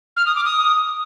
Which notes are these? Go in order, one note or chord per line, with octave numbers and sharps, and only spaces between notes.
F6
D#6
D6
D#6